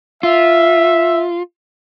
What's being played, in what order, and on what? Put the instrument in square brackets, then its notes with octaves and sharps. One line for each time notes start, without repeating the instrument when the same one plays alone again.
[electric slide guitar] F4 [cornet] E5